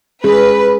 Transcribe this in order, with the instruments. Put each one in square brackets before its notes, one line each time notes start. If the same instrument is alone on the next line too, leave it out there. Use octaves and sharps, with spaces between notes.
[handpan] G#3 C#4 G#4 [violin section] B4